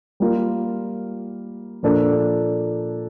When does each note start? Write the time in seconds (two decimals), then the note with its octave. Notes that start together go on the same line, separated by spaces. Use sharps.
0.20 G3 A#3 F4 A#4
1.83 A#2 F3 A#3 D4 A4